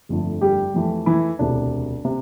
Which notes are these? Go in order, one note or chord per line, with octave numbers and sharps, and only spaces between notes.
G1 F2 D3 A3
G3 G4
F2 E3 A3
E3 E4
E1 D2 C3 D4
C3